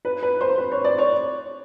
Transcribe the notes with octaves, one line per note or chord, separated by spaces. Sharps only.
B4
B4
C5
B4
C#5
D5
C#5